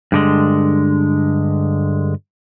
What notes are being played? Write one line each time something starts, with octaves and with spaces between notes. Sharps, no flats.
G2 D3 G#3